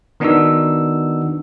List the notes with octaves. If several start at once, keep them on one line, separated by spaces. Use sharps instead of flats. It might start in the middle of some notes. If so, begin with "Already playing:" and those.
D#3 B3 D4 D#4 F#4 E6